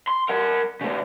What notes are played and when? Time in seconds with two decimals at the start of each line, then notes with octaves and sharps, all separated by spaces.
0.08 C6
0.29 A#4 F#5
0.81 C#3 A3